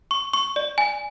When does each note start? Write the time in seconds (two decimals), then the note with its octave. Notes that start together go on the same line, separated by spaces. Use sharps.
0.11 C#6
0.34 C#6
0.56 D5
0.78 G#5